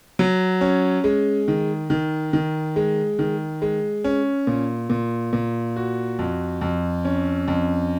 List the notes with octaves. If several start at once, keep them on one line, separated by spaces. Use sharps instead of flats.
F#3
C#4
G#3
D#3
D#3
D#3
G#3
D#3
G#3
C#4
A#2
A#2
A#2
F#4
F2
F2
C#4
F2